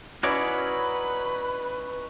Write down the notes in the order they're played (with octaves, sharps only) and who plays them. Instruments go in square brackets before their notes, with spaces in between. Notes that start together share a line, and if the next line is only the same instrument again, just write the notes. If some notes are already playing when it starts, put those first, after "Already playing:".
[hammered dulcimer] C#4 D#4 E4 [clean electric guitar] F#4 C#5 D5 [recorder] B4 [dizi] B5